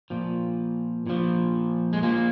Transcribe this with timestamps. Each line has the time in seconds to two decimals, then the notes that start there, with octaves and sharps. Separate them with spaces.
0.10 A#2 F3
1.07 A#2 F3
1.93 G#3
2.03 A#2 F3 A#3